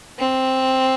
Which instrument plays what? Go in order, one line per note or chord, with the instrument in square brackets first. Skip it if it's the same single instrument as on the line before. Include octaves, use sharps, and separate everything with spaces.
[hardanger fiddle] C4